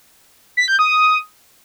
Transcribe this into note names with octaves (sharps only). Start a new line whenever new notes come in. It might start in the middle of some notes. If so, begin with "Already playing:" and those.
B6
G6
D#6